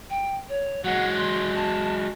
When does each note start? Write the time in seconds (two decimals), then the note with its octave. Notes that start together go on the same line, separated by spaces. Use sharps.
0.10 G5
0.49 C#5
0.84 F#3 G#3 F#5
1.17 C6
1.55 A5